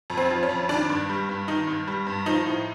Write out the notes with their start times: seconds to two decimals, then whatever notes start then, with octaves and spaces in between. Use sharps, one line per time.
0.10 F2
0.17 C4
0.31 F3
0.43 C#4
0.49 F2
0.69 D#3 D4
0.90 G2
1.09 G3
1.29 G2
1.48 D#3 D#4
1.67 G2
1.88 G3
2.07 G2
2.26 F3 D#4
2.46 A2